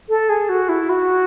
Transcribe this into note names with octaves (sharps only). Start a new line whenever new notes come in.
A4
G#4
F#4
E4
F#4